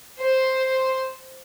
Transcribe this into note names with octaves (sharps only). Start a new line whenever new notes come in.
C5